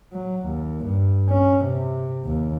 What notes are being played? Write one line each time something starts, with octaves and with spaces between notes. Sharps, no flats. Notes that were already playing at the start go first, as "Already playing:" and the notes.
F#3
D#2
G2
C#4
C3
D#2